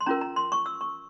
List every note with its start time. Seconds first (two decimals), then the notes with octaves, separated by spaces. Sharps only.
0.01 C6
0.06 C#4 F4 A#4 A#5
0.21 A#5
0.36 C6
0.52 C#6
0.66 E6
0.81 C#6